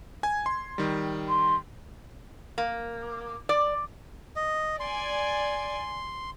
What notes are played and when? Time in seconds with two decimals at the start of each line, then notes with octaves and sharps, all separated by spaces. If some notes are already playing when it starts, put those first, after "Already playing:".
0.23 G#5 G#6
0.46 C6
0.78 D#3 G3
1.29 C6
2.58 A#3
3.49 D5
4.36 D#5
4.80 D5 G#5 C6